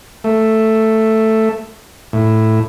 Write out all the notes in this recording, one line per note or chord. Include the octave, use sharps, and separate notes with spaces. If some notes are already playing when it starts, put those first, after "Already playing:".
A3
A2